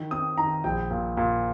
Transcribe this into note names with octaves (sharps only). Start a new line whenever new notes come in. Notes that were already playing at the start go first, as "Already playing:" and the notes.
Already playing: D#3
C4 D#6
D#3 A#5
A#1 G5
A#2
A#2